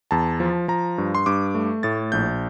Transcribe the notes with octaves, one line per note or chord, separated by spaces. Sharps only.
E2 A5
F3
F3 A#5
G2
C6
G2 D6
A3
A2 A6
A#1 G6